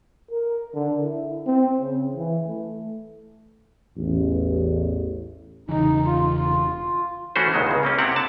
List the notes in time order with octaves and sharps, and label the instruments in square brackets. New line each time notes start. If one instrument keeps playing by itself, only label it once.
[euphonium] A#4
D3
E4
C4
C#3
E3
A3
[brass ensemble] A1 E2
[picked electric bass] E1 C#3 E3 [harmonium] D#4
[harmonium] F4
[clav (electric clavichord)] E3 A3 C#4 F#4 C5
C#2 B2 D#3 F#3 G#3
C#2 C#3
A#3 C4 C#4
C3 C4 E4 G4 F#5
D3 A5